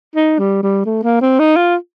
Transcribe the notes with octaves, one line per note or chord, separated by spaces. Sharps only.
D#4
G3
G3
A3
A#3
C4
D#4
F4